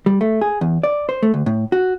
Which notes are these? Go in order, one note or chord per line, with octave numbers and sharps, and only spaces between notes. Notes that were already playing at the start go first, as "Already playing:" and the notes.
G3
A3
G#4
E2
D5
C5
A3
D2
A2
F#4